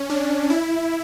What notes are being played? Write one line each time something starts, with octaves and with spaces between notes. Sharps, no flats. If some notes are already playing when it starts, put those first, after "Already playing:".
Already playing: C#4
D4
E4